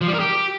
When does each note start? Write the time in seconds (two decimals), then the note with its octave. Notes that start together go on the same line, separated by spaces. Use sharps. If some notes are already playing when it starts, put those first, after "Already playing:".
0.01 F3
0.07 G3
0.14 A#4
0.20 G4